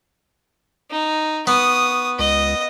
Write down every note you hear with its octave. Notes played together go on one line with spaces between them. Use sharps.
D#4
B3 C#6 D#6
C#2 D#5